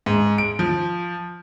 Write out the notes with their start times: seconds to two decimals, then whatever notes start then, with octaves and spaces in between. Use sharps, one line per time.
0.06 G#2
0.38 D7
0.59 F3